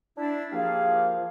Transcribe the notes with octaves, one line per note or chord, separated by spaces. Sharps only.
D4 E4
F3 A#3 G4 G#4 F5